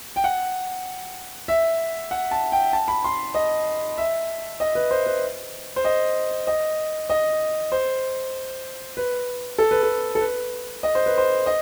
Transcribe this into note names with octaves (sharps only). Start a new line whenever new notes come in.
G5
F#5
E5
F#5
A5
G5
A5
B5
C6
D#5
E5
D#5
B4
C5
B4
C5
D#5
D#5
D#5
C5
B4
A4
B4
A4
A4
B4
D#5
C5
B4
C5
D#5